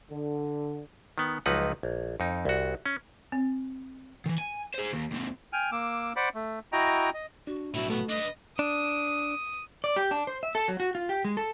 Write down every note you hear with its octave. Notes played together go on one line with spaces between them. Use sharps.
D3
D#3 B3
C#2 F3 F#3 D#4 B4 F#5
A#1
F2 D#4
C2 F#4
C#4
C4
D#3 E3
G#5
G#4 C5
D#2
D#2 C4
G5 G#5 F6
A#3 D6 E6
C5 D5 F#5 B5 D6
A3
E4 F#4 D#5 G5 A#5
D#5
D4 F#4
B1 A2 E4 F#4
A3 B3
D4 B4 D#5 D#6
D4 D#6
D5
G4
D4
C5
E5
A4
F#3
F#4
F4
G4
G#3
A4